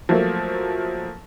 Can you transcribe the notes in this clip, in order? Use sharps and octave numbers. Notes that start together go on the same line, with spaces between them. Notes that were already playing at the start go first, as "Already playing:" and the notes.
F3 F#3 A3 A#3